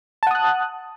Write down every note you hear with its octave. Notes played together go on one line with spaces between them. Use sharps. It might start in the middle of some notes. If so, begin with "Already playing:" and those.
F#5 A5 D#6 F#6